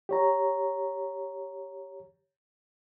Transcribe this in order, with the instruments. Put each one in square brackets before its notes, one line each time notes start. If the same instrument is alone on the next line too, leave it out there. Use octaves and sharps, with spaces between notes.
[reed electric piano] G4 C#5 A#5